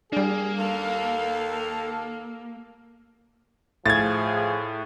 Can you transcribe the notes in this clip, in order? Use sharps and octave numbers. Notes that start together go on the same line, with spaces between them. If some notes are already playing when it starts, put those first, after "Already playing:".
G3 A#3 D4 G#4
D#2 A4 F5
A2 F3 G#4 G#6 A6